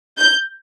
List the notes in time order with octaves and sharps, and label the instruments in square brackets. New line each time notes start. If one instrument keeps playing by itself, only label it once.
[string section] G6